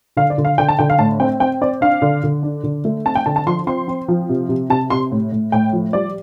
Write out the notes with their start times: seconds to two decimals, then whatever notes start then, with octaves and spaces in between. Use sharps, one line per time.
0.17 D3 F5
0.30 D5
0.38 D3
0.45 F5
0.58 D3 G5
0.68 A5
0.79 D3 G5
0.90 F5
0.99 A2 A5
1.20 C4 G5
1.40 C4 G5
1.61 C4 D5
1.81 D4 F5
2.02 D3
2.23 D3
2.43 D4
2.63 D3
2.85 A3
3.05 C4 A5
3.15 G5
3.26 D3 A5
3.36 A5
3.47 F3 C6
3.67 C4 C6
3.88 C4
4.08 F3
4.29 C3
4.49 C3
4.70 C3 A5
4.90 C3 C6
5.12 A2
5.32 A2
5.52 A2 G5
5.73 F3
5.93 G3 D5